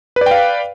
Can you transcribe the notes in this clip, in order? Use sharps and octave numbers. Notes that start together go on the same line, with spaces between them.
B4 D5 F5 G5